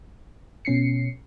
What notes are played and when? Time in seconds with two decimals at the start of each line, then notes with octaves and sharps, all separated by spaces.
0.65 B2 C#4 C7 C#7